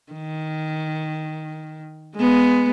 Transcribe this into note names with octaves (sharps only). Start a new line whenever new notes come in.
D#3
G#3 B3